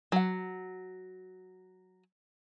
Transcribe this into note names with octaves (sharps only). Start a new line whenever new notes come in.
F#3 F#5